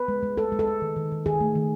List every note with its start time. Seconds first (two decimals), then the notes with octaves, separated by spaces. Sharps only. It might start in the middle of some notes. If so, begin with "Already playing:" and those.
Already playing: B4
0.08 G#3
0.23 G#3
0.37 G#3 A4
0.52 G#3
0.59 A4
0.67 G#3
0.82 D#3
0.96 D#3
1.12 D#3
1.26 D#3 G#4
1.40 A3
1.55 D#3